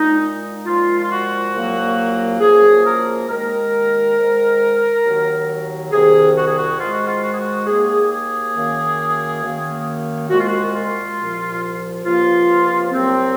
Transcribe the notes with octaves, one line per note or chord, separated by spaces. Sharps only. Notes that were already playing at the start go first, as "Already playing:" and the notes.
Already playing: A#2 G#3 D#4
A#2 F3 G#3 F4
F4
F#4
C2 A#2 F#3 A#3
F#2 F3 A#3 G#4
A#4
D#2 D#3 G#3 A#4
G#2 D#3 G#3
D#2 D#3 F#3
C2 C3 D#3 G#4
F#4
G#4
F#4
G#2 D#3 G#3 F4
F#4
F4
F#4
G#4
F#4
D#2 D#3 A#3 G#4
G#4
F#2 D#3 A#3
F#2 D#3 A#3
C2 A#2 G#3 F#4
F4
F#4
F4
C2 A#2 F3
C#2 C3 F3 A#3 F4
C2 C3 F#3 C4